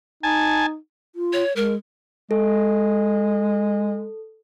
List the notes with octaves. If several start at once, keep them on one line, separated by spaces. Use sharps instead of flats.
D#4 G#5 A5
F4
C#5
G#3 A#4
G#3 A4